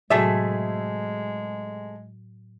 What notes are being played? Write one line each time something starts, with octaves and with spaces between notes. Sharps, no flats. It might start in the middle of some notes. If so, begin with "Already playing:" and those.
A2 C3 F#3 G#3 A3 F#4 G#4 E5